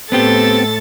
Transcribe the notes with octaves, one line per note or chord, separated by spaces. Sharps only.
A2 B3 C4 G4 A4 A6